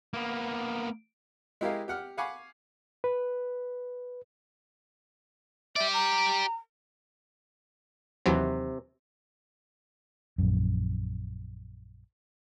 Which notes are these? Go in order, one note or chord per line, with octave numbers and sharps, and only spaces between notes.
A#3 B3
G#3 E4 G4 A#4 D#5 F5
G4 F#5 F6
F5 F#5 G#5 B5 C#6 D6
B4
G4 D5 E5
A#5
D#2 C3 E3 F#3
A#1 F#2